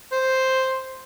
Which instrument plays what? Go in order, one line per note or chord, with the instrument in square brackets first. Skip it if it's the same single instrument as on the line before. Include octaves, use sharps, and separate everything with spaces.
[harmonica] C5